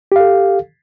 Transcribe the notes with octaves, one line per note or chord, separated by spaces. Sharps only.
G4 A4 F5